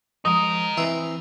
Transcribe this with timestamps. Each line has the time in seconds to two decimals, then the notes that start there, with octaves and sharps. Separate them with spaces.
0.25 F3 G#3 D#4 A#4 D#6
0.77 E3 C4 B4 E5 G5 C6